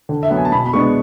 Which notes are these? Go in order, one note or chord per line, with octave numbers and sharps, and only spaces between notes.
D3
E5
F#3 B3 F#5
G#5
A5
B2 B5
B5
G#3 B3 D4 C#6